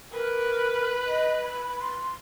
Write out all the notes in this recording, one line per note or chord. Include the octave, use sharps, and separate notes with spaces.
A#4 B4
D#5
B5
C6